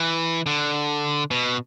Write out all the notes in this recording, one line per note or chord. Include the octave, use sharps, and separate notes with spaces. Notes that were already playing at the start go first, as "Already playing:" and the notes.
Already playing: E3
D3
B2